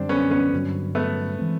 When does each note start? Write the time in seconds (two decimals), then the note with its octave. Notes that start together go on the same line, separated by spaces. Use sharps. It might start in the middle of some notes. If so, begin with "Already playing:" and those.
Already playing: F#2 D3 G3 C4 D4
0.09 B3 C#4
0.31 B3 C#4
0.53 G2 D3 F#3
0.95 A3 B3
1.38 E3 G#3 C4